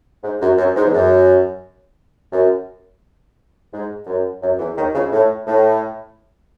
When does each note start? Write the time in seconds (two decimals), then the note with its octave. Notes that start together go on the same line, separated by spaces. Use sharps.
0.23 G#2
0.41 F#2
0.58 F#2
0.76 G#2
0.85 E2
0.93 F#2
2.33 F#2
3.73 G#2
4.07 F#2
4.42 F#2
4.59 E2 E3
4.76 D#2 D#3
4.94 C#2 C#3
5.12 A2
5.47 A2